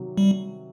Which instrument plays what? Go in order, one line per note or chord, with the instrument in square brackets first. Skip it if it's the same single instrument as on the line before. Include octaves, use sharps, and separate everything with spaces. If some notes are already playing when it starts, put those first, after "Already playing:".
Already playing: [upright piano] C3 D#3 F#3
[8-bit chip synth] G3